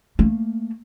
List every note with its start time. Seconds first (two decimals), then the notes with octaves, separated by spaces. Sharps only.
0.19 A3 A#3